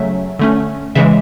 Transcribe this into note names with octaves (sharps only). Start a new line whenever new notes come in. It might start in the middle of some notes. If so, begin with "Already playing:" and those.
Already playing: C#3 F#3 A3 C#4 E5
D3 A3 C#4
C#3 E3 G#3 E5